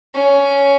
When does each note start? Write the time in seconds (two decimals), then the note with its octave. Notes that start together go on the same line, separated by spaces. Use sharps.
0.15 C#4